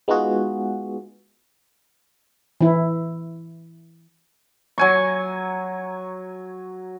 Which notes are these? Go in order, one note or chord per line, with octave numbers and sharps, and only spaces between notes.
G#3 B3 D#4 F4 F#4 G#4
E3 E4
F#3 G#5 C#6